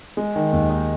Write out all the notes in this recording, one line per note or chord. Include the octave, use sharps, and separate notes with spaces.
G#3
D#3
D#2
D#4